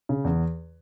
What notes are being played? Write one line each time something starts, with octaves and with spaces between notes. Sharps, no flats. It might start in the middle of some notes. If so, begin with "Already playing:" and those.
C#3
E2